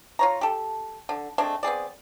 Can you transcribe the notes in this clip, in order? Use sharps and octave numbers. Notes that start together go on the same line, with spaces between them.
F4 C#5 A#5
G4 A4
D3
G#3 A3 C4 D4
B3 C4 G#4 D5